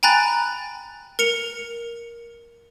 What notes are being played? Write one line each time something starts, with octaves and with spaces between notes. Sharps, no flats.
G5 G#5 A#5 B5 F#6 A6
A#4 C#7 F7